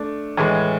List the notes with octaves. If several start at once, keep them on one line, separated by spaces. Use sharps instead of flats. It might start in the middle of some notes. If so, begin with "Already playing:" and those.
Already playing: A3 D4
A2 E3 G#3